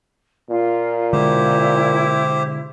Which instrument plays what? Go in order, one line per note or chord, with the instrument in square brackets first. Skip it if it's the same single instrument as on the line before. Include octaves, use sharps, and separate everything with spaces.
[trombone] A#2 [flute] F4
[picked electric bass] B2 D3 G#3 [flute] E4 [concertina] G4 C5